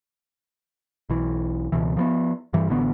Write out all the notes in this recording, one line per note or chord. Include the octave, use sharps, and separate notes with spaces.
B1 E3
C#2 B2 E3
F3 F#3 B3
G2 E3 G3
A1 D3 B3